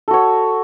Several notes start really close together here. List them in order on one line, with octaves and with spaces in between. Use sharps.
A4 F#4 C#5